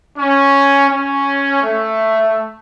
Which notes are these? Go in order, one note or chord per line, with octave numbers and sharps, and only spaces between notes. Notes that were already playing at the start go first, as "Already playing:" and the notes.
C#4
C#4
A3